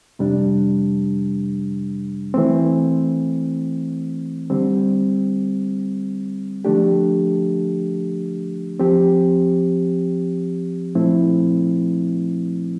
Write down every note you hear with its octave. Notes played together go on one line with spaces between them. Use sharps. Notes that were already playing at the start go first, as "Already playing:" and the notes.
F2 C3 G3 D4
E3 A3 C4
D3 G3 C4
D3 F3 A3 D4 G4
F3 C4 G4
A#2 F3 A3 C4 E4